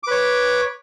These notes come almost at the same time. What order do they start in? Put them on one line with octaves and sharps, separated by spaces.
D6 B4 C#5